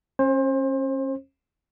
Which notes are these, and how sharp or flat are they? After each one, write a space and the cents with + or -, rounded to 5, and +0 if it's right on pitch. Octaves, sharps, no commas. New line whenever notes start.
C#4 -35 C5 +30